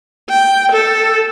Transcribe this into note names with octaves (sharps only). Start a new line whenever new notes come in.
G5
A4